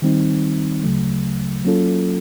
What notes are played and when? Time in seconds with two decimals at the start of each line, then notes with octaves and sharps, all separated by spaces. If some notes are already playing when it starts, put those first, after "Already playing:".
0.02 D#3 G3 C4 D#4
0.83 D2 C#3 F#3 A3
1.65 F#3 A#3 C#4 F4 A4